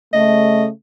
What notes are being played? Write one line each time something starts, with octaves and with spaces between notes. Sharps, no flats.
C#3 A3 D#5